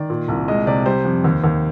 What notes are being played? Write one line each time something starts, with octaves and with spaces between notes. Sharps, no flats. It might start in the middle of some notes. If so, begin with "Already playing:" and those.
Already playing: D#3 D5
A#2
C2
G#3 D#5
C3 D5
G3 C5
F2
D#2
D#2